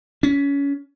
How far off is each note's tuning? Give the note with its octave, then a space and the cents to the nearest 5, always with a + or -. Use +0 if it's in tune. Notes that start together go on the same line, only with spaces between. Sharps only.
C#4 +25